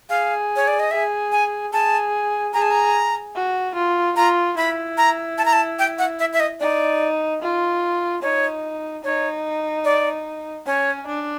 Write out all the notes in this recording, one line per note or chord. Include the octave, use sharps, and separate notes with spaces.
G#4 F5
C#5
D5
D#5
G#4 E5
G#5
G#4 A5
G#4 A#5
A5
A#5
F#4
F4
F4 A#5
E4 B5
A#5
A5
A#5
A5
G5
F#5
E5
E5
D#5
D#4 D5
F4
D#4 C#5
D#4 C#5
D5
C#4 C#5
D4